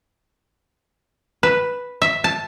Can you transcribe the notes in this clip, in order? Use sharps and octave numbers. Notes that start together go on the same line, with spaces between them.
B4
E5
A5